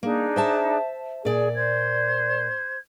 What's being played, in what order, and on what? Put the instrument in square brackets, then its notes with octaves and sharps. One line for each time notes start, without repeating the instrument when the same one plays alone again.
[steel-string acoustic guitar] A#3 [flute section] D4 D#4 G#4
[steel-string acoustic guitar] C5 E5 A5
[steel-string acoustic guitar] A#2 D5 [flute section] G#4
[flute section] C5 G#6